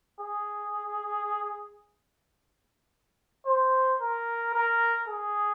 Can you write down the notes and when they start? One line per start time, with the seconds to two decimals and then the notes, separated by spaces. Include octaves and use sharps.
0.20 G#4
3.46 C5
4.01 A#4
4.54 A#4
5.08 G#4